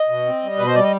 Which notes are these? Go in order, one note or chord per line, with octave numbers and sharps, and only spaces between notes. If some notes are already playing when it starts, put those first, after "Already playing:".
Already playing: D#5
B2
C4
G3
B2 B4
C5
G3 D5
D#5